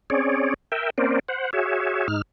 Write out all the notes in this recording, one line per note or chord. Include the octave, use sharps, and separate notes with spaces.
C4 C#4 G#4 C#5 D5
A#4 E5 G5
A#3 C4 C#4 A#4 C5 D5
C5 F#5
F#4 G#4 C#5 E5
G#2 D#4 F6